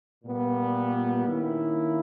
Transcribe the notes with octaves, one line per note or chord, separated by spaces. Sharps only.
A#2 G3 B3
D#3 A#3 C#4 E4